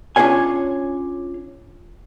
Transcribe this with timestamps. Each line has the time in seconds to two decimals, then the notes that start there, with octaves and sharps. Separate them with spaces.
0.16 C#4 D4 F4 G#4 C#5 G#5